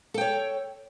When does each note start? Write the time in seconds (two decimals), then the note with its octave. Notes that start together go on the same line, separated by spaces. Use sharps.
0.14 A4
0.18 G5
0.21 C#5